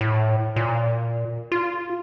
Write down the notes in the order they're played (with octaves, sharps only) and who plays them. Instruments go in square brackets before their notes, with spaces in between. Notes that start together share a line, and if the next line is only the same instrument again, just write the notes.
[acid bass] A2
A#2
F4